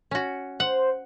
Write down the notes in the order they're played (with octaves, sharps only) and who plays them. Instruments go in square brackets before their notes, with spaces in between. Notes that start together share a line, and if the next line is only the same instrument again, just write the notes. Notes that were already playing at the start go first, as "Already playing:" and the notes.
[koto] C#4 F#4
[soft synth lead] C5 [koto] F#5